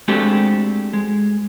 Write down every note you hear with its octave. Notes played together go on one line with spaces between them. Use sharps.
G#3 A3 C4 D4 F#4 G4
G#3